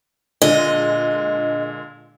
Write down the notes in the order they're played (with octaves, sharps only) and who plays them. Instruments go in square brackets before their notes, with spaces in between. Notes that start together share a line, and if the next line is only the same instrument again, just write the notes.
[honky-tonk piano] A#2 D3 G#3 [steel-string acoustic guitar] D#5